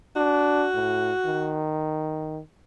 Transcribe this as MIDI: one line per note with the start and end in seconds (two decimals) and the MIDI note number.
0.16 0.66 62
0.16 1.66 66
0.74 1.12 45
1.25 2.40 51